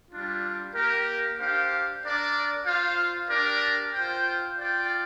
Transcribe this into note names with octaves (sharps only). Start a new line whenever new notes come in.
G3 D4 F4
A#3 G4 A#4
D4 G4 C5 F5
D4 A#4 D5
F4 C5 F5
D4 G4 A#4 D5
F4 C5 G5
F4 D5 G5